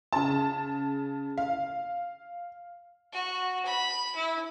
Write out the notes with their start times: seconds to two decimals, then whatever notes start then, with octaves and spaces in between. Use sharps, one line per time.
0.13 C#3 A5
1.38 F5
3.12 F#4
3.65 B5
4.15 E4